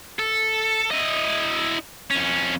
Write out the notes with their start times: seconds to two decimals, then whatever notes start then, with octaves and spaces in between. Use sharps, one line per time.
0.19 A4
0.91 E4 D#5
2.11 F2 C#4